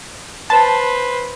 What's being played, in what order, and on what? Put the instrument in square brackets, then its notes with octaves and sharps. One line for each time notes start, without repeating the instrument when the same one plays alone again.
[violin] B4 C5 [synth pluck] A5